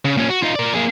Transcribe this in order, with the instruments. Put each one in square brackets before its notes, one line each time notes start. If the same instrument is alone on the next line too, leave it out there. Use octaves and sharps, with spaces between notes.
[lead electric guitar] C#3
A#2 C#4
F#4
D#4 F4
A#4 D5
A#3 G#4